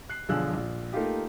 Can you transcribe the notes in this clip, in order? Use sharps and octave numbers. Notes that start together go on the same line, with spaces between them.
F#6 C7
B1 D3 F3 G#4 E6 F#6
A#1
A3 A#3 D#4 F4 G4